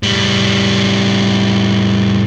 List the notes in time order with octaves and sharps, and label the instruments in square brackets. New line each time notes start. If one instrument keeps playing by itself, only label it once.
[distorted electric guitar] A2 G3